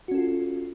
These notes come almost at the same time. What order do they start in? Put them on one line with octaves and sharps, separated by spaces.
F#4 C#4 A4 F4